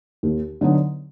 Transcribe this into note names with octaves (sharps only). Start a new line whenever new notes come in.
D#2
D3 F#3 B3 D#4